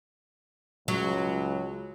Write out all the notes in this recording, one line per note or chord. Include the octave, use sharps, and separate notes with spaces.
C#2 F#3